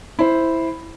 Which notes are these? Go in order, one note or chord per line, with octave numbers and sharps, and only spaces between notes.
E4 C5